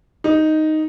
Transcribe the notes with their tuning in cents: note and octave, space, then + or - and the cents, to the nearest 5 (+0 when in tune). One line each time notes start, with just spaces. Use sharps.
D#4 +0